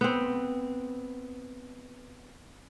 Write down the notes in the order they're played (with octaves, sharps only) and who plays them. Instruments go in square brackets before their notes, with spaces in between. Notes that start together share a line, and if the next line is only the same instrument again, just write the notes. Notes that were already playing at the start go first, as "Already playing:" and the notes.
[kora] B3 C4